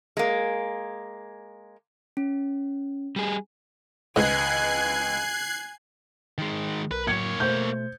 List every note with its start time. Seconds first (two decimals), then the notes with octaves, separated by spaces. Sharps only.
0.17 G#3 A#3
2.17 C#4
3.16 G3 G#4
4.16 C#2 G#2 B4 D#5 G#5 F#6 G#6 C7
6.38 D#3 G#3
6.91 B1 A#4 B4
7.07 A2 F#3 A#3 C#5 G#6 C#7
7.40 B2 A3 C5 G6